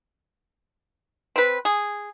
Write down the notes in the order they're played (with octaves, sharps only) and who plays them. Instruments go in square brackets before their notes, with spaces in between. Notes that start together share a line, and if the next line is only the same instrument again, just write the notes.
[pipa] C4 B4
G#4